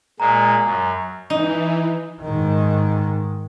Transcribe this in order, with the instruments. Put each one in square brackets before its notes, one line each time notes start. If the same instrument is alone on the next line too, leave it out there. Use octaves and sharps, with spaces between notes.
[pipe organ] A#2 G#3 [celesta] A#5
[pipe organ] F#2
[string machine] E3 [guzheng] D#4
[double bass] G#2 D#3